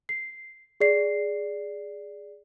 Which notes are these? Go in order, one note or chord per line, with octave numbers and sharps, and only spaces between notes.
C7
G#4 D5 C7